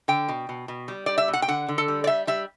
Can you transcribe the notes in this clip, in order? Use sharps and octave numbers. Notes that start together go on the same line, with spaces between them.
D3 G5
B2
B2
B2
G3
G3 D5
E5
B2
F#5
G5
D3 F#5
D3
A4
G3
D5
G3 E5
G3 E5